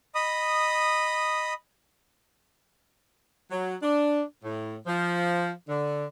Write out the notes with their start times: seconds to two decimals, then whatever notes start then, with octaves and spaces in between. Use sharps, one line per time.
0.15 D#5 B5 D#6
3.51 F#3
3.82 D4
4.43 A2
4.86 F3
5.68 D3